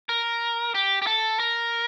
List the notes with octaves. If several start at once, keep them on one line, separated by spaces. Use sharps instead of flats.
A#4
G4
G4
A4
A#4